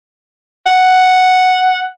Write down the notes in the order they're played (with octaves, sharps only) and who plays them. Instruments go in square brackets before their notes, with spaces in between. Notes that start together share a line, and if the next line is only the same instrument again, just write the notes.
[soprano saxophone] F#5